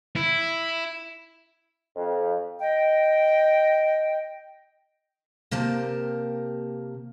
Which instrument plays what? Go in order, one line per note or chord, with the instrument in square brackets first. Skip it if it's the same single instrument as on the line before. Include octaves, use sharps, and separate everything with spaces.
[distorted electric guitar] E4
[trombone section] F2
[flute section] D#5 G5
[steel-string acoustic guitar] C3 A#3 G4 A#4 A5